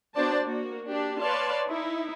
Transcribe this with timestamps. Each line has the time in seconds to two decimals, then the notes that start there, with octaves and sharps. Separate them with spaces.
0.15 B3 D4 F#4 C5 D5 A5
0.44 A#3 F#4
0.88 D4 G4
1.19 B4 C#5 D5 F5 A5 C6
1.67 D#4 E4